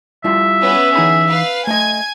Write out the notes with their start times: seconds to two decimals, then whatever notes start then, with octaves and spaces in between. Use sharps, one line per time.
0.24 G3 E4 F4 E5
0.61 B3 C#4 B4
0.95 E3 D#4 G#4 B5
1.29 B4 F5
1.67 A3 D#5 G#5 G#6